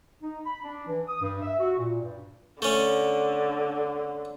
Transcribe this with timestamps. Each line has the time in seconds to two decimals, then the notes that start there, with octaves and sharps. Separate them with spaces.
0.23 D#4
0.46 B5
0.64 D4
0.87 E3
1.08 D#6
1.21 G2
1.42 E5
1.60 F#4
1.77 A#2
2.01 G2
2.62 D3 A3 C#4